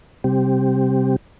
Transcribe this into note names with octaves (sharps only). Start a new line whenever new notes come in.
C3 G3 C4 G4